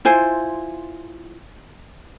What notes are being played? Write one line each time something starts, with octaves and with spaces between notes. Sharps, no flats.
E4 F4 C5 G#5